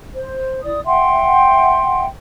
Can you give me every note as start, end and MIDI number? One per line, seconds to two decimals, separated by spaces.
0.15 0.63 72
0.63 0.80 64
0.63 0.80 74
0.63 0.80 87
0.86 2.06 76
0.86 2.06 78
0.86 2.06 79
0.86 2.06 84